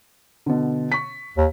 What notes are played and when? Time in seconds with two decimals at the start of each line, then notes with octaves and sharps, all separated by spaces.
0.46 B2 D3
0.92 C#6 B6
1.37 D#2